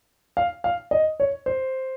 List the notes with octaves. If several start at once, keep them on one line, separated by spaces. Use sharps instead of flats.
F5
F5
D#5
C#5
C5